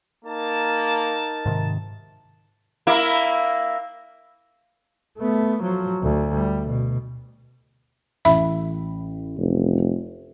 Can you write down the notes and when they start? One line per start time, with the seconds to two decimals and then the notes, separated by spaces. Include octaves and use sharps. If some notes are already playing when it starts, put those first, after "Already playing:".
0.24 A#3 D#4 A#4 A5
1.46 G#2 C3 D#3
2.87 A#3 E4
5.19 A3 B3
5.63 F3 F#3
6.03 D2
6.35 G3
6.68 B2
8.25 A1 E5 B5
9.38 F1